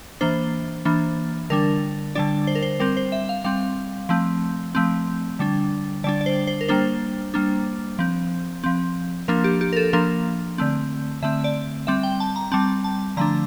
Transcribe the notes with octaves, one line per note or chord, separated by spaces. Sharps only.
E3 A#3 D4 C5
E3 A#3 D4
D3 G3 D4 A#4
D3 G3 D4 D5
C5
A#4
C5
G3 C4 A#4
C5
E5
F5
G3 C4 F5
F3 A3 C4
F3 A3 C4
D3 G3 D4
D3 G3 D4 D5
D5
C5
C5
A#4
G3 A#3 D4 C5
G3 A#3 D4
F3 C4
F3 C4
F3 A#3 D4 A#4
G4
G4
A#4
A4
F3 A#3 D4 A#4
D3 A3 C4
D3 A3 C4 E5
D5
G3 C4 E5
G5
A5
A#5
G3 C4 A5
A5
D3 F3 A3 D4 A#5